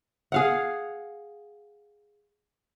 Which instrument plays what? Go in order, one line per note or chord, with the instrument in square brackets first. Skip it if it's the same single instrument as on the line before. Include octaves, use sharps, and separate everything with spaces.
[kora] G#4 F5 F#5